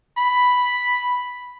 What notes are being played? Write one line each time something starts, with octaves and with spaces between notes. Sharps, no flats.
B5